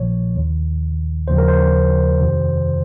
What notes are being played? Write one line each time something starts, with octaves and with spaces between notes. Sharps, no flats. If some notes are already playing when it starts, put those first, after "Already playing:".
Already playing: A#1 A#2 F3 C#5
D#2 D#3
D#2 C#3 F3 C5
A#4
C5
F2 C3 D#3